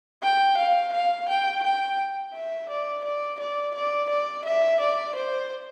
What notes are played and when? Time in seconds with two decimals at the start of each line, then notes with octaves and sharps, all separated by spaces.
0.23 G5
0.57 F5
0.93 F5
1.29 G5
1.63 G5
2.34 E5
2.69 D5
3.05 D5
3.40 D5
3.75 D5
4.10 D5
4.45 E5
4.80 D5
5.15 C5